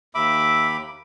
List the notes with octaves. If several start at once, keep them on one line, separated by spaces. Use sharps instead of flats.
D#2 E5 B5 D6